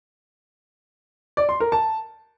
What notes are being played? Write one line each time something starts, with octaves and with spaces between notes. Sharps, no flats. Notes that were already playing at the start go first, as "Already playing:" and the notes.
D5
C6
A#4
A5